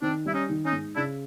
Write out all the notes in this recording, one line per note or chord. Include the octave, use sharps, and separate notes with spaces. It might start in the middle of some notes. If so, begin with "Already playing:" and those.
D#3 C4 D4
G3 E4
C#4 D#4
D#3
C#4 D#4
G#2
C#3 D4 E4